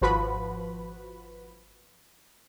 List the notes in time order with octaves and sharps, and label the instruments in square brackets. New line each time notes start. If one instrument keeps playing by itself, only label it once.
[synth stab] G#1 F3 F#4 B4 B5